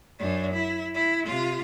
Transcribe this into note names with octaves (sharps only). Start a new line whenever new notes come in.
F#2 D4
E4
E4
C3 F4